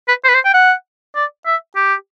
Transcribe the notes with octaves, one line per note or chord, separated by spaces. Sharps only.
B4
C5
B4
C5
G5
F#5
D5
E5
G4